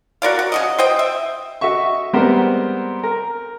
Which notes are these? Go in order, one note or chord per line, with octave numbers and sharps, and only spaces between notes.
F#4 A#4 D5 F5
F#4
C#3 F#4 D#5
C5 D#5 G5
E5
F#4 D#5 E5 C#6
G3 G#3 B3 C4 A#4 C5
A#4